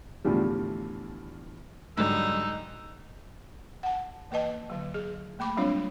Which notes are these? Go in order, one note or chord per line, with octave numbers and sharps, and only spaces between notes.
E2 A2 D3 E3 F3 G3
G#2 D3 F#3 G3 D#4 E6
F#5 A5
E3 A#3 B4 D#5 A5
D3 F#3
G#4
A3 A#3 B5 D6
F#3 G3 C4 D4 F4 C#5